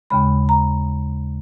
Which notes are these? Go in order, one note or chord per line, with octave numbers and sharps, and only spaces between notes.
D#2 C#3 G#3 B5
A#5